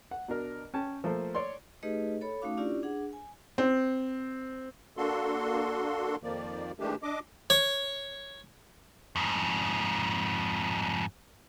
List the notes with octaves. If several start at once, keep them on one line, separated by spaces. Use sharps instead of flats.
F#5
B2 D4 A#4
C#4 G5 A5
F3 A3 A#3 C5
C#5 D5 C6
A3 D#4 G4 G#4 B4 D#5
A4 C#5 B5
A3 C#4 D#4 F#4 F5 D6
C#4 D4 E4 F4 G4 D5
D4 G#4 F#5
G#5
C4
A#3 D4 F#4 A4 C6
F2 D#3 F3 A#3 D5
D#3 E3 G#3 A3 D4 G4
D4 D#5 D6
C#5
F2 G#2